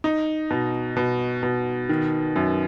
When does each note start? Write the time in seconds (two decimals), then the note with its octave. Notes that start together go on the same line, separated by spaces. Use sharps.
0.04 D#4
0.50 B2
0.97 B2
1.43 B2
1.89 D#3
2.36 F#2